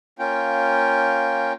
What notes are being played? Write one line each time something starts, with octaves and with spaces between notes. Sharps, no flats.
A#3 C#4 F4 G5